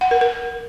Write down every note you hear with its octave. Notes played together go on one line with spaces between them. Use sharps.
F#5
A#4
A#4